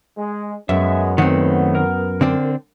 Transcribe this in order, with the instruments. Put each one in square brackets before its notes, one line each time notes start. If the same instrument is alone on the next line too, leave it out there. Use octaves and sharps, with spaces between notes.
[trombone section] G#3
[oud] F#2 [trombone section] G#3 B3 C#4 [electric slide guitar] E5
[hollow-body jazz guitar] D#3 C4 [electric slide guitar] A3 C#5 F#5 [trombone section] B3
[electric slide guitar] A#4
[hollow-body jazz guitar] D3 C4 D4